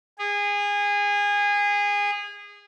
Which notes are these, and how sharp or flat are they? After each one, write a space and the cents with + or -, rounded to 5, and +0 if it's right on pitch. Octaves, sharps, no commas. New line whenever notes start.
G#4 -25